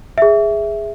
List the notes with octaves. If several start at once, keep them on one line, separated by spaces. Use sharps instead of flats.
G#4 E5